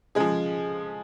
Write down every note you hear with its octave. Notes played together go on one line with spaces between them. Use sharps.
C#3 F3 G#3 G#4